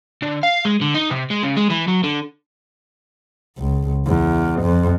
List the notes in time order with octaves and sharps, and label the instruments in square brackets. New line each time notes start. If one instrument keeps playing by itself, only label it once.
[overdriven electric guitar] D3
F5
G#3
D3
D#4
C3
G#3
C#3
G#3
E3
F#3
D3
[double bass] C#2
E2
F2